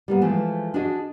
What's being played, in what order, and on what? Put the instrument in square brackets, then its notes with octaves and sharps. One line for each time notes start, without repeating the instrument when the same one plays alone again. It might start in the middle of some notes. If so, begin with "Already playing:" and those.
[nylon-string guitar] G3 A#3 B3
E3 F3 G#3 A3
D4 F#4 G#4 D#5